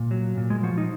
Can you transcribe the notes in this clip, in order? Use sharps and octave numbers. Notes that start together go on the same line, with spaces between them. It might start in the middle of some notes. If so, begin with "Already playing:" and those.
Already playing: A#2
F#3
A#2
G#3
F3 F#4
D#4